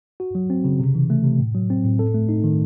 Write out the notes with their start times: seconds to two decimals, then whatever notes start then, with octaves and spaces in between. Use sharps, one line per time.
0.20 F#4
0.35 F#3
0.50 C4
0.64 C#3
0.80 C3
0.95 E3
1.10 A3
1.24 C3
1.39 A2
1.55 F#3
1.70 C4
1.84 A2
1.99 A4
2.14 A3
2.29 D#4
2.44 D#3